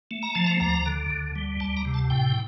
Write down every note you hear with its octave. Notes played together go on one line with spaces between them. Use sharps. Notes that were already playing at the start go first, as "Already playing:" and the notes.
A3
A#5
F3 A5
A#5
D2 A#5
D3
D2
G3
D2 A5
A#5
C3
A5
A2 G5